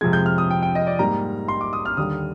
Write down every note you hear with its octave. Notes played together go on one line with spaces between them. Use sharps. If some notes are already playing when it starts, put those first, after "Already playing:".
F2 C3 F3 G#3 G#6
G6
F6
D#6
G5
G5
D#5
D5
G#2 G3 A#3 A#5
C6
D6
D#6
F6
D#2 D3 G3 D#6